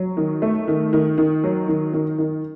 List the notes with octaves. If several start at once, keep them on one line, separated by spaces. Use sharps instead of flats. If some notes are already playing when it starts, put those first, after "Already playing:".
Already playing: F#3
D#3
A3
D#3
D#3
D#3
F#3
D#3
D#3
D#3